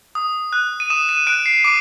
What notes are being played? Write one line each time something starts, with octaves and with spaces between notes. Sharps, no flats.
D#6
F#6
D#7
D#6 E7
D#7
F#6 D7
C7
D6 D7